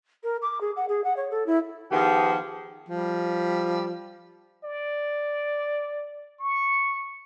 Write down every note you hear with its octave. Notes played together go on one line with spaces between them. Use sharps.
A#4
D6
G#4
F#5
G#4
F#5
C#5
A4
E4
D#3 F3 B3 F4 G4 G#4
F3 G3
D5
C#6